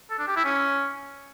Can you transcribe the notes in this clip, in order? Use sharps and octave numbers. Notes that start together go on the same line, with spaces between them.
A4
D4
G4
E4
C#4